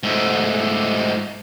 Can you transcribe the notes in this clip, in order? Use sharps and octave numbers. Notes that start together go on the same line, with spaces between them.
G#2 A3